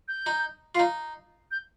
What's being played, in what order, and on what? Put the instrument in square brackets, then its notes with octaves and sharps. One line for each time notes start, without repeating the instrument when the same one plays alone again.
[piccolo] G6
[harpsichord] D#4
F4
D#4
[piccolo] G6